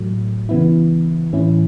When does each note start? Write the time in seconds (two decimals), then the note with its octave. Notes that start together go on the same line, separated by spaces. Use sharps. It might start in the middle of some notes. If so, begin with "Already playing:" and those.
Already playing: A2 F#3 A3
0.49 C#3 E3 B3 E4
1.33 A2 E3 C#4 E4